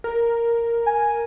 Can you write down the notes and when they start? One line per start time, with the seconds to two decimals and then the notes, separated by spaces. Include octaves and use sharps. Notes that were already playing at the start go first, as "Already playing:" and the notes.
0.04 A#4
0.86 G#5